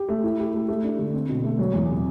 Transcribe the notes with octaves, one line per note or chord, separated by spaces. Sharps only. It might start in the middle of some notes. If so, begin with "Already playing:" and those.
Already playing: G4
A3
E4
G4
A3
A3
D4
D3
C4
B2
A3
F#3
E2
C3